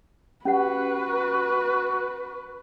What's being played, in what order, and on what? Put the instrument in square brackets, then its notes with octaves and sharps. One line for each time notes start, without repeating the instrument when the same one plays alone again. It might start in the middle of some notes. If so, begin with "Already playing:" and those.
[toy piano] C#4 G4 F#5 [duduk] F#4 [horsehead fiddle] B4